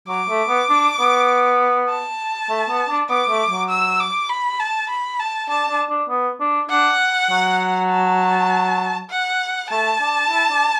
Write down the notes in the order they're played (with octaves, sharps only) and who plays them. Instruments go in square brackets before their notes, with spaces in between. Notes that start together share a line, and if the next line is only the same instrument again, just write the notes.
[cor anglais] F#3 [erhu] D6
[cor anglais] A3
B3
D4
B3
[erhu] A5
[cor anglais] A3
B3
D4
[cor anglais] B3 [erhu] D6
[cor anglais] A3
F#3
[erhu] E6
D6
B5
A5
B5
A5
[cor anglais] D4 [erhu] A5
[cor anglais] D4
D4
B3
D4
[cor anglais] D4 [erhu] F#5
[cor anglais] F#3
[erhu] A5
F#5
[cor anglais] A3 [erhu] A5
[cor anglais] D4
E4
D4